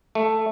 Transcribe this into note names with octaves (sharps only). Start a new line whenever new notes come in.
A3